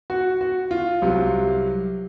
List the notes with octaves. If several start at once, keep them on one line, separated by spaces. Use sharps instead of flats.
F#4
F#4
F4
C2 C3 F#3